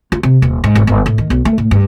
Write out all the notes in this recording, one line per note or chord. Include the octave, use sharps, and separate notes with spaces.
F4
C3
D#1
G#2
G#1
G1
A2
D#3
B1
A3
A2
G2